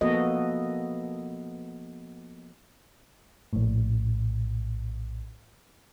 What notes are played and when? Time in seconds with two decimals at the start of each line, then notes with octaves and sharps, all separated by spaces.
0.01 F3 A#3 B3 F#4 A4 D#5
3.53 A#1 A2